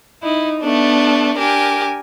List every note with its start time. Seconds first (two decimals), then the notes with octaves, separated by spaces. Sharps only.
0.23 D#4 E4
0.61 A3 B3 D4
1.38 D4 G4 A#4 G#5